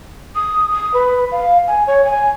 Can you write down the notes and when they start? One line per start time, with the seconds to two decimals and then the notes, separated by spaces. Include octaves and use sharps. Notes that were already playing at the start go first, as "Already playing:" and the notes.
0.35 D#6
0.71 D#6
0.94 B4
1.32 F5
1.68 G#5
1.87 C#5
2.05 G#5